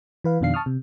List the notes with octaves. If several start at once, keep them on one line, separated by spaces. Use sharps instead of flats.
E3 B4 F5
F2 B2 D#3 D4 F5 C7
A5 C#6 D#6 F6
C3